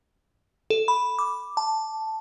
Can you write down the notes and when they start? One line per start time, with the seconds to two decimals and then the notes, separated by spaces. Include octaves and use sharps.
0.70 A4
0.88 B5
1.19 D6
1.57 A5